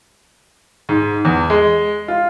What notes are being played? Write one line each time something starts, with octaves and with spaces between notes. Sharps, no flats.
G#2
E2
G#3
F4